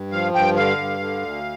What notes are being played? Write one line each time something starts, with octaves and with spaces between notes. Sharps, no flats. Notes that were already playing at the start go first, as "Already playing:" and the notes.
Already playing: G2
F3 F5
G2 G5
D3 F5
G2
D3
D2